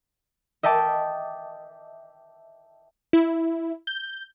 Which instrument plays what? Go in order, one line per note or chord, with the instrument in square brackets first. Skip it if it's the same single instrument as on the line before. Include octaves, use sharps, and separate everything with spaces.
[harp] D#5 E5 G5 A5 D6
[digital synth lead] E4
G6